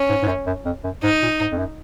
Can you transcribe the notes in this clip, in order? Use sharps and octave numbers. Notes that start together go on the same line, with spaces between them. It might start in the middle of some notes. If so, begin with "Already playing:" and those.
Already playing: C#4
G#2
G#2
F#2
F#2
F2
F#2
G#2 D#4
A#2
G#2
F2
F#2